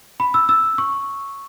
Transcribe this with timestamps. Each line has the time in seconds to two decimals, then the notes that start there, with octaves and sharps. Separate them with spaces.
0.20 B5
0.34 E6
0.49 E6
0.78 C#6